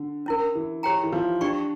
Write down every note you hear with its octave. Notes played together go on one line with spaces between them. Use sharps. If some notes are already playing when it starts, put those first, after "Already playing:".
Already playing: D3
C#4 E4 A#4
E3
G4 C#5 G5 A#5
E3
F3
D4 G4 D5 G5 C#6